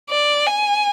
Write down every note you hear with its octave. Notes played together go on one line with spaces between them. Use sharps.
D5
G#5